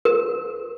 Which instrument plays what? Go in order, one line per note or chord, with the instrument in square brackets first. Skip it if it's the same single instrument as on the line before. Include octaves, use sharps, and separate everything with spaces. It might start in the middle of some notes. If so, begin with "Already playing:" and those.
[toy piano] A#4